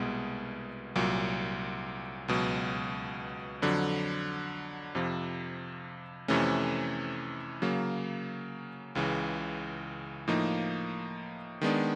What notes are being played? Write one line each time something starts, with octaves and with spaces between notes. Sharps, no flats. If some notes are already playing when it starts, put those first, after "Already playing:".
Already playing: C2 B2 G#3 B3
C2 A#2 F#3
C#2 B2 F#3
F2 D3 F#3
F2 C3 F3
F2 C3 E3 A3 C#4
C#3 F#3 A#3
C#2 C#3 E3
A2 F3 A#3 D#4
D#3 G#3 B3 D4